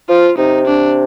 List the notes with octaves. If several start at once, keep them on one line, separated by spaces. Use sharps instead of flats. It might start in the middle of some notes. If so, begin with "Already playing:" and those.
F3 F4
C3 D#4
D4